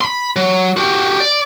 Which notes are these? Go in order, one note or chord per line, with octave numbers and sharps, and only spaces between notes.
B5 C6
F#3
F#4 G4
D5